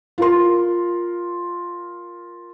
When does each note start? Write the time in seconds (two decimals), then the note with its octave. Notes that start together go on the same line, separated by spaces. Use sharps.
0.18 F4 A#4 C6